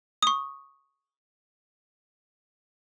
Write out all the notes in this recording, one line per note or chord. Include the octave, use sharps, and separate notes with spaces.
C#6 D#6